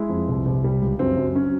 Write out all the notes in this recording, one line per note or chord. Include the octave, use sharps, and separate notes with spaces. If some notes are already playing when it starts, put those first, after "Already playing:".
Already playing: G#3 E4
F2
C2
C2
G3
C#2
F#2 C4
F#2
F#3 C#4